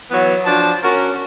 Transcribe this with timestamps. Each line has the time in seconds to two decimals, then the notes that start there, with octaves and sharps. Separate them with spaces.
0.10 E3 F#3 B3
0.44 F3 D4 F#4 A5
0.82 C#4 F#4 A#4